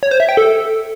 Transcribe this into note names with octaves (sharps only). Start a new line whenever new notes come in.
C#5
C5
E5
G5
A4